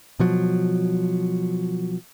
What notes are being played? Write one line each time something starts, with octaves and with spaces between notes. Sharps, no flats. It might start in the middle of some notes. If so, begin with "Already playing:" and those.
B2 F3 F#3